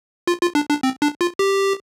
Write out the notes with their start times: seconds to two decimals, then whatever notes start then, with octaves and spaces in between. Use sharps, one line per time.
0.27 F4
0.41 F4
0.55 D4
0.69 D4
0.83 C4
1.02 D4
1.21 F4
1.39 G4